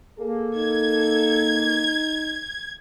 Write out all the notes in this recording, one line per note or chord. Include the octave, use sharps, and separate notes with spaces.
A#3 G#4 A4
D#4 G#6